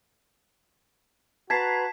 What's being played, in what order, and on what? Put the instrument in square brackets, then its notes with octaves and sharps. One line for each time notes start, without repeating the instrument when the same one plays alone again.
[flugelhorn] F#4 [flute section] B4 A#5 [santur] A5 [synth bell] G#6 B6 C7